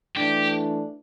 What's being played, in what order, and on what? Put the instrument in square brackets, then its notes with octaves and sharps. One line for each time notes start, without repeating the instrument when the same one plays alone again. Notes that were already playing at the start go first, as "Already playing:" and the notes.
[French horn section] E3 A3 D4 [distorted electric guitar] G4